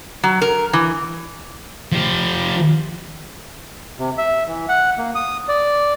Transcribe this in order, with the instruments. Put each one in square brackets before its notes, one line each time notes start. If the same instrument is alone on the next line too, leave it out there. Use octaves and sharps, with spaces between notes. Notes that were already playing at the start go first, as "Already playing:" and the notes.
[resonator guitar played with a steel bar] F#3
A#4
E3
[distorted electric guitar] F3 G4
[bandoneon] C3
E5
E3
F#5
A#3
D#6
D5